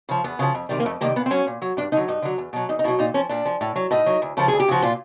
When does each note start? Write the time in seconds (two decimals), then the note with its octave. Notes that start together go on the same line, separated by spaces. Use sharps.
0.09 C#3 F3
0.24 E2 B3
0.39 C#3 F3
0.54 F2
0.69 C3 D#3 G3
0.80 A#3
0.85 F2 A3
1.01 C3 D#3 G3 A#3
1.16 A#2 B3
1.26 C4
1.30 F#3 C#4
1.47 A#2
1.62 F#3
1.77 G2 D4
1.92 D3 F#3 D#4
2.08 G2 D#4
2.22 D3 F#3
2.38 E2
2.53 B2 F#3
2.69 E2 D#4
2.79 D#4
2.84 B2 E4
2.88 F#3
2.99 A#2 D#4
3.14 F3 C#4
3.29 A#2 D4
3.45 F3
3.61 A2
3.76 F#3
3.91 A2 D#4
4.06 F#3
4.22 D2
4.37 C#3 F3 A4
4.48 D2 G#4
4.60 G4
4.68 C#3 F3 F#4
4.82 A#2 F4